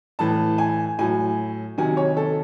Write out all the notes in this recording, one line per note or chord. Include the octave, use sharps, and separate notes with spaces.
A2 E3 A5
G#5
A2 F#3 G#5
C3 D#3 F#3 G#5
C#5
A4